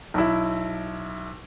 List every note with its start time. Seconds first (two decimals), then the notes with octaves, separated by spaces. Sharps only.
0.14 B1 E4